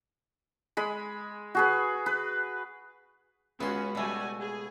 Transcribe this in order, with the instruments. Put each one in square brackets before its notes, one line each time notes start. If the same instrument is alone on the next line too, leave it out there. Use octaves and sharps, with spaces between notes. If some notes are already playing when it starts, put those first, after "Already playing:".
[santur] G#3 B5
F#4 G#4 B4
B4
[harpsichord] C#2 C6 [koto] B3 [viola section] C#4 F#4
[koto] B2 A3 [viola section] G3 F#4 G#5
[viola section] G#4